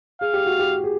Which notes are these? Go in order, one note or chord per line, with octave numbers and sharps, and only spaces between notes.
G#4 F5
G4
F#4
G4
G#4